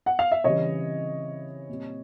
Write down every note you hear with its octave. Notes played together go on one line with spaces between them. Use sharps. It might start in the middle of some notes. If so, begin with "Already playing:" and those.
F#5
F5
E5
C#3 E3 G3 C4 C#5 D#5
A#2 G3 C4